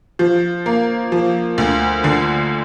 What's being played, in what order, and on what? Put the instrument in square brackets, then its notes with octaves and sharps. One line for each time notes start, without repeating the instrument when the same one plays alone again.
[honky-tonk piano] F3
A#3
F3
D2
D3